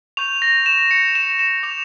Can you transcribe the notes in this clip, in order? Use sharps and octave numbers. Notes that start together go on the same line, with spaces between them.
C#6 G6 F7
A#6
E7
C#7
E7
E7
D6 G6 F7